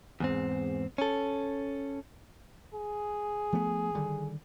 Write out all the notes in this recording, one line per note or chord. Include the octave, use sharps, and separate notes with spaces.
E2 G#2 C4
C#4 A4
G#4
F3 A3 B3
D3 D#3 G3